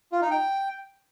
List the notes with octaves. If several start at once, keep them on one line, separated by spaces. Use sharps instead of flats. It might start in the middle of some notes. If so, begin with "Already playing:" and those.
F4
D#4
G5